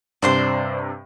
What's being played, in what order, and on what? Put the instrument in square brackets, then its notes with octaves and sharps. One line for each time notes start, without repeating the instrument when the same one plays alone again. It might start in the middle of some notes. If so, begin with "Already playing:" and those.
[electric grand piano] G2 C3 [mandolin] D4 C5 C6